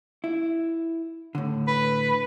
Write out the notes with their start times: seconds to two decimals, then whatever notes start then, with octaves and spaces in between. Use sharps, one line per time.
0.24 E4
1.35 A2 D3
1.67 B4